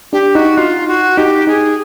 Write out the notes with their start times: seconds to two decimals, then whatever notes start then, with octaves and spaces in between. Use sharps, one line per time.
0.13 D4 G4
0.35 D#4 F#4
0.57 D#4 F4
0.88 F#4
1.17 D#4 G4
1.47 D#4 G#4